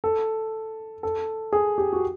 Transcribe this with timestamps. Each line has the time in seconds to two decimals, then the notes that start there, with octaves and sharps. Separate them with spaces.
0.04 A4
1.03 A4
1.53 G#4
1.78 G4
1.93 F#4